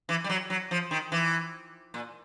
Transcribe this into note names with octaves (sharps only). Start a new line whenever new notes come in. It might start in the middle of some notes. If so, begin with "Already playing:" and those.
E3
G3
F#3
F#3
F3
D#3
E3
A#2